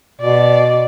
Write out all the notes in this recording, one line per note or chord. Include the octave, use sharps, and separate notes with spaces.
B2 D5